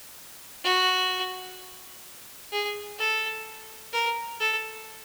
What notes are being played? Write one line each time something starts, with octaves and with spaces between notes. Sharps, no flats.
F#4
G#4
A4
A#4
A4